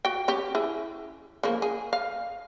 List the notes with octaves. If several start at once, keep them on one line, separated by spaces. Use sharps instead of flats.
F#4 G5
C#4 G4
E4 G#4
C#3 F3 A#3
G#4
F5